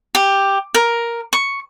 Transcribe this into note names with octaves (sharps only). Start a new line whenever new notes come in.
G4
A#4
C#6